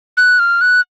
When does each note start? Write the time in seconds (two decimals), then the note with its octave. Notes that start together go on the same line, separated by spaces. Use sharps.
0.17 F#6
0.39 F6
0.61 F#6